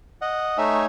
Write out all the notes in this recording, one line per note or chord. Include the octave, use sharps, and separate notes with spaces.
D#5 F#5
A3 D#4 C#5 E5 G#5